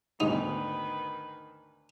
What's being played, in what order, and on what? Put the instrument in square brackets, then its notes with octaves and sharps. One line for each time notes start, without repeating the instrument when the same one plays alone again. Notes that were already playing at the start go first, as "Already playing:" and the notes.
[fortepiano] D2 G#2 B2 [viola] D#3 B4 [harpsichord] D#4